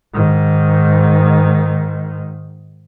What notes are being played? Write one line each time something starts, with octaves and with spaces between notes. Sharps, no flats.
G#2 D#3